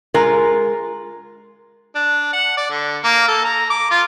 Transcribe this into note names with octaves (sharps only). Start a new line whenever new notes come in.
G#3 F4 A#4
D4
F#5
D5
D3
A#3
A4
A#5
D6
F4